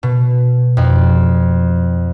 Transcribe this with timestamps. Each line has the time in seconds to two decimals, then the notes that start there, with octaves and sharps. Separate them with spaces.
0.03 B2
0.77 F2